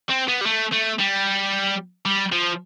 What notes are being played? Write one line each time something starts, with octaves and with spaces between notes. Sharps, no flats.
C4
B3
G3
A3
A3
G3
G3
F3